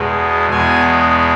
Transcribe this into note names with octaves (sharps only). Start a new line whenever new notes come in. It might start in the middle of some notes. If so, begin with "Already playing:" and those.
Already playing: E2 B2 G#3
E2 B2 G#3 G#5